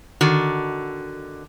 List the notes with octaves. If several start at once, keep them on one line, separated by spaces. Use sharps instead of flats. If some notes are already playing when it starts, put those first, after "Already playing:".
D3 D#3 F#4